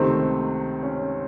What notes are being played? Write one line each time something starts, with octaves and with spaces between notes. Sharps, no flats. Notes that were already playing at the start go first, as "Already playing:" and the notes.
Already playing: C#2 C3 D#3 A3 C4
C#4